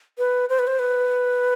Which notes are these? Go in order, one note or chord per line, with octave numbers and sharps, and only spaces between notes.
B4
C5
B4
C5
B4